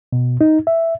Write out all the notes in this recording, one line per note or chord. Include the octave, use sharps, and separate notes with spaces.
B2
D#4
E5